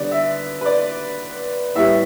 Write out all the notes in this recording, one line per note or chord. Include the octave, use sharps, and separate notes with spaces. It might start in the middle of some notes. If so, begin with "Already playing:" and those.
Already playing: D3 G3 B3 D5
E5
B4
D5
A2 G3 B3 E5